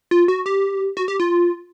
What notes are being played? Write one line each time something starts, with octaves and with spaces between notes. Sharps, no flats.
F4
F#4
G4
F#4
G4
F4